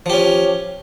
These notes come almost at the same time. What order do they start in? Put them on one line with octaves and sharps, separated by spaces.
F3 G4 C#4